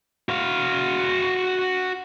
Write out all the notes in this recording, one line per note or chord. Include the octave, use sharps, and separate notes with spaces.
F#4 F5